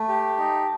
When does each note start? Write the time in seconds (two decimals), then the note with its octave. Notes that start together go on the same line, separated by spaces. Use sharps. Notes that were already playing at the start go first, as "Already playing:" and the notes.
Already playing: A3 A5
0.08 G4
0.38 D#4